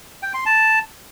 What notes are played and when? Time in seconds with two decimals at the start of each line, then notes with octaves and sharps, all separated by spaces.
0.22 G5
0.34 C6
0.46 A5